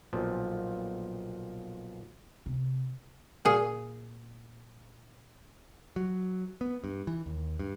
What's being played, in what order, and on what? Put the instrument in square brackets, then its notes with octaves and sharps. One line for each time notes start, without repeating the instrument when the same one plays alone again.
[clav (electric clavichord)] B1 A#2 F3
[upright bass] C3
[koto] A#2 G#4
[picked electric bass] F#3
B3
G2
E3
D#2
G2